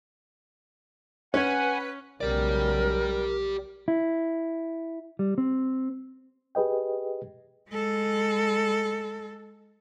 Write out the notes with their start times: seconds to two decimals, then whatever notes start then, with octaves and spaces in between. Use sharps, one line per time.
1.34 C#4 B4 C#5 F#5 G#5
2.21 B1 C#3 G#3 G4 A#4 D5
3.88 E4
5.19 G3
5.38 C4
6.55 G4 G#4 B4 D#5 G5
7.69 G#3 A4